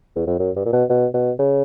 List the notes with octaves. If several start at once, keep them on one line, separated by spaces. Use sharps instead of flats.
E2
F2
F#2
G2
A#2
B2
B2
B2
C#3